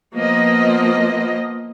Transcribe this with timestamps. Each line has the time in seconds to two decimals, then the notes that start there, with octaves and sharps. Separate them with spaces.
0.16 F3 A#3 B3 D#5